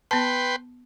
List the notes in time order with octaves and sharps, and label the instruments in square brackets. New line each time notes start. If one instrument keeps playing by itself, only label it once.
[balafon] B3 A5 [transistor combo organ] B4 G5 C6